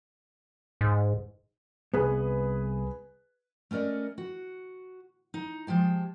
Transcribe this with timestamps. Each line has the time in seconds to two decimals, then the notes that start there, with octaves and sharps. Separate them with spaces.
0.81 G#2
1.94 C2 B3 G#4 B4
3.71 A3 C#4 A#4 D5 D#5
4.18 F#4
5.34 D#4
5.67 F3 G#3 G4 A5